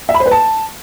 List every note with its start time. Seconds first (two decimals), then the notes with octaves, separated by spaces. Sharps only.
0.09 E5
0.14 B5
0.20 C5
0.26 B4
0.31 A5